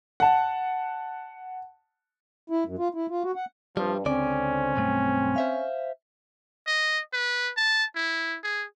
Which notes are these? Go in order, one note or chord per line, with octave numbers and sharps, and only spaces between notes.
F#5 A5
E4
F#2
F4
E4
F4
F#4
F#5
G2 C3 F3 G3
C#2 D3 C4 C#4 D5
B1 G2 A3
C5 E5 F5
D#5
B4
A5
E4
G#4